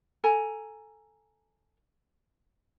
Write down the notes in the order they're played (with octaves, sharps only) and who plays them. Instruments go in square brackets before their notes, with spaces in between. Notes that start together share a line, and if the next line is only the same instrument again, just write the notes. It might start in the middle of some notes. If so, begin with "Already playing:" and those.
[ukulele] A4 G#5 A#5